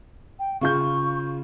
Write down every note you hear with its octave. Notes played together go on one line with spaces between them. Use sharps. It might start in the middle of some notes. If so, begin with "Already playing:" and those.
G5
C#3 F4 C#6 G6